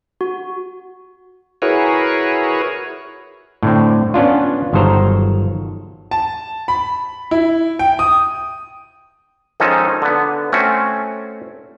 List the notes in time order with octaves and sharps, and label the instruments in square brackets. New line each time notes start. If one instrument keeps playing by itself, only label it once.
[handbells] F#4
[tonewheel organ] E4 F#4 G#4 A#4 B4 C#5
[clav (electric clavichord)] A2 D3 C4
B3 C#4 D4 F4
G1 D#3 F#3 A4 C5 A#5
[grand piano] A5
B5
E4
G5
D#6
[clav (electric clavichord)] D#3 F3 G#3 C#4 D#4 A4
D3 B3
A3 C4 C#4 F#4